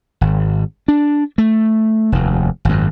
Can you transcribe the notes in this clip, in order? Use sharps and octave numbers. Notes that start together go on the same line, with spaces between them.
G#1
D4
A3
F1 D#2
G#1 F#2